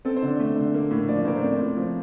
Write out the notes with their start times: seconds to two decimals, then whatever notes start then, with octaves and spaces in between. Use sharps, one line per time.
0.05 C4 A4
0.17 C5
0.23 D3 D5
0.39 A3
0.56 D3
0.74 A#3
0.91 A2
1.08 F3 D5
1.25 A2 A#4
1.35 C5
1.42 C4 D5
1.59 A2
1.77 F3